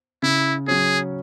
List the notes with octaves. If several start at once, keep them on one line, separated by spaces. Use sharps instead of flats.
C#3 E4
F#3 C#4 G#4